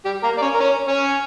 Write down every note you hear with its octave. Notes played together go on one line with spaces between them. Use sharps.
G3 G4
A#3 A#4
D5
C#4 C#5
A#4
C#4 C#5
C#4 C#5